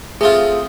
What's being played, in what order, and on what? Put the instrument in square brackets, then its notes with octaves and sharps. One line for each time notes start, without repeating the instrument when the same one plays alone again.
[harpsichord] A3 C4 F4 [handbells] G#4